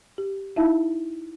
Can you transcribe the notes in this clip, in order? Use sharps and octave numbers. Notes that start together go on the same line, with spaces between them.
G4
D#4 E4 E5 F5 A5